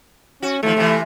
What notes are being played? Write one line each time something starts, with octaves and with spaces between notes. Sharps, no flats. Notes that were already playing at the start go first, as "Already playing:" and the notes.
C#4 F#4
D#2 F3 A3
C3 E3